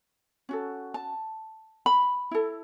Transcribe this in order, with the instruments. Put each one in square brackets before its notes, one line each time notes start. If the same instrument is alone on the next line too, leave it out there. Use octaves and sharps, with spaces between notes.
[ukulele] C#4 F#4 A4
A5
B5
E4 A4